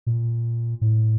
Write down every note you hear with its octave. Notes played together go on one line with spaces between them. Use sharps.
A#2
A2